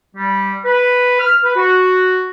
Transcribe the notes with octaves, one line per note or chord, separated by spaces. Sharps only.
G3
B4
F6
B4
F#4